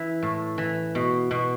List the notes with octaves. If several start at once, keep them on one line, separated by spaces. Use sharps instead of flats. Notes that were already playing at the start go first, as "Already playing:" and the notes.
Already playing: E3 E4
A2
E3
B2
B2